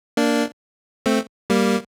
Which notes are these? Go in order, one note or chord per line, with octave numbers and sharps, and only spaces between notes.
A#3 D4
A3 C4
G3 A#3